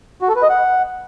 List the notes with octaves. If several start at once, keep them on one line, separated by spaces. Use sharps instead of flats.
F#4
A4
B4
D#5
F#5